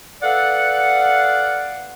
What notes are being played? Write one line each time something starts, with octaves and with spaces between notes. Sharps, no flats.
A4 B4 D5 F5 F#5